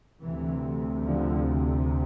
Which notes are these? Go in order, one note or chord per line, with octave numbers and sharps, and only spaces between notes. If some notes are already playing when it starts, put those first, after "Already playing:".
D2 C3 E3
D3 F3